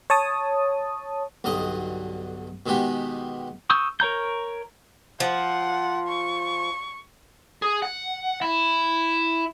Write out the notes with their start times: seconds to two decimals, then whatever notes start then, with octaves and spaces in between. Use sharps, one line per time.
0.10 C#5 A5 D#6
1.44 B1 G2 D3 D#5 D#6
2.66 B2 D#3 G#3 B3 G4
3.70 C#6 D#6 E6 G6
4.00 A#4 C#5 A#5 G6
5.20 F3 F#5
6.08 C#6
7.62 G#4
7.82 F#5
8.42 E4